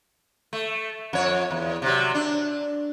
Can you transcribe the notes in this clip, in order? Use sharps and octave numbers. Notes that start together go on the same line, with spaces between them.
A3
F2 C#5
E2
C3 F#3
D4